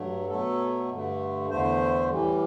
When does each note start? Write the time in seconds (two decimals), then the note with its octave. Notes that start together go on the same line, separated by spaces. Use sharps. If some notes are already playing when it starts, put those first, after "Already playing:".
Already playing: G2 F#3 A3
0.30 B2 F#3 A3 A4
0.90 G2 D3 A3
1.50 E2 D3 A3 C5
2.10 A2 E3 G3